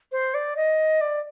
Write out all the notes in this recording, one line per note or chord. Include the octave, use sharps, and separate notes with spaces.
C5
D5
D#5
D5